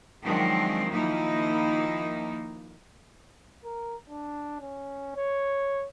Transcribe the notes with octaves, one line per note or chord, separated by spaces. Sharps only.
D#3 F3 F#3 G#3 C4 D4
D#3 F3 A#3 D#4 E4
A#4
D4
C#4
C#5